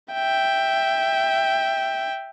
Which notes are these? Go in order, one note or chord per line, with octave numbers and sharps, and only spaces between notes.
E5 G5